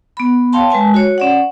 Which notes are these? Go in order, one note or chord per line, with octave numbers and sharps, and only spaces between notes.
B3 B5
C#5 F5 G5 A5 C6
G#3 B4 G#5 A5
F#4 C#5
C#4 D5 F#5